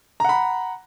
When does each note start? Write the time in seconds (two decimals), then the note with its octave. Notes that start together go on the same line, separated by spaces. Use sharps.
0.20 A#5
0.24 F#5
0.29 B5